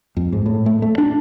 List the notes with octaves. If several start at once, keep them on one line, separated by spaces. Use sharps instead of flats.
F2
G#2
A2
A3
A3
D4